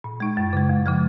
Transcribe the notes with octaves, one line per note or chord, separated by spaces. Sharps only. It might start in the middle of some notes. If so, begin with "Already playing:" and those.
A#2
G#3 D#4
F#2
C#3 G#3
F2
C#3 F3 G#3